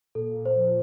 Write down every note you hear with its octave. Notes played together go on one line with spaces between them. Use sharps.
A#2 A4
A#2
C5
F3